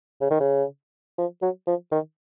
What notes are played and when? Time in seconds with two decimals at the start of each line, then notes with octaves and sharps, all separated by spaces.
0.21 C#3
0.30 D#3
0.40 C#3
1.18 F3
1.42 F#3
1.67 F3
1.92 D#3